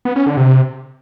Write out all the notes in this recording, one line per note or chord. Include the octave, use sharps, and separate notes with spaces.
B3
C#4
D3
C3